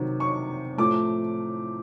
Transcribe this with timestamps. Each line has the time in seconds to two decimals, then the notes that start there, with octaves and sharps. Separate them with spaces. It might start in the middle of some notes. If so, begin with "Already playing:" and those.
Already playing: C3 D#3 F#3
0.20 C#6
0.78 A2 F3 A3 D6